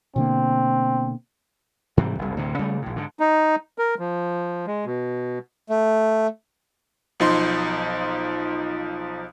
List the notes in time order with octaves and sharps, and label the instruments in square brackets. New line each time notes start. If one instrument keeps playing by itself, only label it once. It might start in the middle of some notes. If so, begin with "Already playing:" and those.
[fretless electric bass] B2 D3 A#3 [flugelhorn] C4
[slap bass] G#2 C3 E3 G3
F#1 C2
D2 A2 C3
C#3 G3 A3
A#1 A2
G#2 D3
[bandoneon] D#4
A#4
F3
G#3
B2
[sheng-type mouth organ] A3
[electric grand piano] B1 F3 D#4 C6